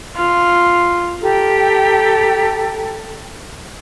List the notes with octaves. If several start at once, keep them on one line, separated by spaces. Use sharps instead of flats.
F4
G4 A4 G5 A#5